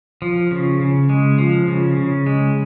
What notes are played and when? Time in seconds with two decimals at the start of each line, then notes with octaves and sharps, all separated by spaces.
0.22 F3
0.51 C#3
0.80 C#3
1.10 G#3
1.38 F3
1.68 C#3
1.97 C#3
2.26 G#3